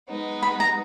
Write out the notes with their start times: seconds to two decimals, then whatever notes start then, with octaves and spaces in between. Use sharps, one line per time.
0.08 G#3 B3 D#4
0.42 B5
0.60 A#5